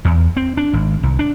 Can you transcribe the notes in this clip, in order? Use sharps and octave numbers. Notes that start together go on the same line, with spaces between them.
E2
C4
D4
G#1
C2
D4